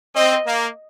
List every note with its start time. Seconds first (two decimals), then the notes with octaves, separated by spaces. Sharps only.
0.16 C4 D#5
0.47 A#3